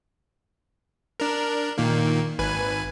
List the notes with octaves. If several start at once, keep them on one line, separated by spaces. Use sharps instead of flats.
D4 A#4
A#2 D#3 A#3
G#1 B4 G#5